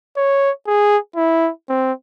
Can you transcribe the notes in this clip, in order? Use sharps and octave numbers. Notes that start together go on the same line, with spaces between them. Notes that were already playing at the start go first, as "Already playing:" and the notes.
C#5
G#4
E4
C4